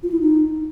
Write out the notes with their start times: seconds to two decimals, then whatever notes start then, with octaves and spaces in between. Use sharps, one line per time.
0.03 F4
0.12 E4
0.20 D#4